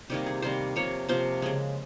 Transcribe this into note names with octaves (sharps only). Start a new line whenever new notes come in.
C3 D#3 G3 A#3 G4
G#4
C3 D#3 G3 A#3 C5
C3 F3 A#3 C#5
C3 F3 A#3 C5
C#3 G#3